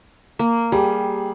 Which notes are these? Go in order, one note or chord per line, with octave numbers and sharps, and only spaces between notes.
A#3
G3 G4 G#4